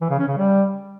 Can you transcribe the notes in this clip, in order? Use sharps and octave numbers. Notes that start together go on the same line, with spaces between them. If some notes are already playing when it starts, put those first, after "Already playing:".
E3
C#3
C#4
C#3
G3